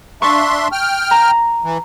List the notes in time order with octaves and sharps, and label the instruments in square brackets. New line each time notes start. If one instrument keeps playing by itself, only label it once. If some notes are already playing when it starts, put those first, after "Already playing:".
[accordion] D4 E5 C6 [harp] A5 C#6
[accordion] G5 F6
[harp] A#5
[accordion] E3